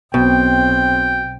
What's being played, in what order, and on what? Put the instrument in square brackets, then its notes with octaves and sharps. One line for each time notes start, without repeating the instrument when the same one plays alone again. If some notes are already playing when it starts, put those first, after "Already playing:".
[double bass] B1 C4 [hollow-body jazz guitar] B2 [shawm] G5